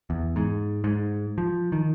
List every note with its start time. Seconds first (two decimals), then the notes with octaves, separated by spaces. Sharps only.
0.10 E2
0.36 G#2
0.84 G#2
1.38 F3
1.72 D#3